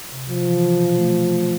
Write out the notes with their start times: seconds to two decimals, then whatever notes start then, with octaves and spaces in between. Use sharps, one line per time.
0.11 C3
0.29 C3 F3
0.46 E3
0.63 E3
0.80 B2
0.97 A3
1.15 B2
1.32 A3